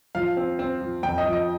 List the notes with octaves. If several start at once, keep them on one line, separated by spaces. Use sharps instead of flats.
F3 F5
C4
C4
F3
F2 G5
D#5
F3
D#5